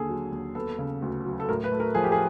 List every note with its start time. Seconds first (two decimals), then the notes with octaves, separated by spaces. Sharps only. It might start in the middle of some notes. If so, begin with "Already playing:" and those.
Already playing: D#2 D3 G#4 A4
0.09 F#3
0.32 D#2
0.55 B3 A4
0.79 C#3
1.02 D2
1.25 F#3
1.40 A4
1.49 A2 A#4
1.64 B4
1.72 A3
1.80 A#4
1.95 F3 G#4
2.04 G4
2.12 G#4